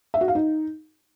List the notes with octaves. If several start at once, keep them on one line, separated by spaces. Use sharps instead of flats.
E5
F#4
F5
D#4